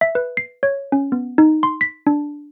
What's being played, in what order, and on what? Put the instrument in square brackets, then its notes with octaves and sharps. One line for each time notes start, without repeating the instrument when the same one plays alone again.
[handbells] E5
B4
C7
C#5
C#4
B3
D#4
C6
B6
D4